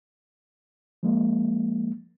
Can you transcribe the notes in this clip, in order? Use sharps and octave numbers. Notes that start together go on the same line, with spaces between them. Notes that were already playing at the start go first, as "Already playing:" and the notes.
F3 G#3 A#3